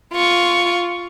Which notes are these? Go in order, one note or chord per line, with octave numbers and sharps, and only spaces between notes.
F4 C#6